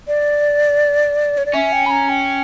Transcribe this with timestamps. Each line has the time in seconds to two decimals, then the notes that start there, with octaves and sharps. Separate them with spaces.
0.08 D5
1.38 C#5
1.46 D5
1.54 C#4 E5
1.73 G5
1.86 B5
1.91 A#5
2.09 G5